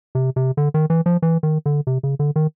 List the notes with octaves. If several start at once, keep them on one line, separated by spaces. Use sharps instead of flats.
C3
C3
D3
D#3
E3
F3
E3
D#3
D3
C3
C#3
D3
D#3